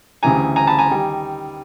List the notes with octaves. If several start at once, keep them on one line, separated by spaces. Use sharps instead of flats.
D2 C#3 E3 G3 G#5 A#5
G#5 A#5
A5 B5
G#5 A#5
D#3 G3